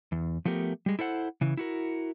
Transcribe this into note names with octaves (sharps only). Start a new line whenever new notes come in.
E2
F3 A3 B3 G4 A#4
G3 G#3
E4 A4 C5 F#5
C#3 E3
E4 F#4 A#4